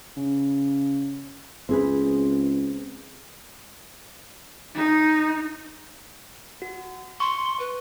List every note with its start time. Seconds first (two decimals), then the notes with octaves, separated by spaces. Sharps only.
0.17 C#3
1.69 C#2 C4 G#4 B4
4.75 D#4
6.62 F#4
7.20 C6 C#6
7.60 B4